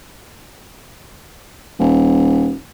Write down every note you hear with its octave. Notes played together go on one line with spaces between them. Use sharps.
D#1